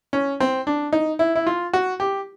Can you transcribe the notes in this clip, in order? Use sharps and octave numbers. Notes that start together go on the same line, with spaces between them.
C#4
C4
D4
D#4
E4
E4
F4
F#4
G4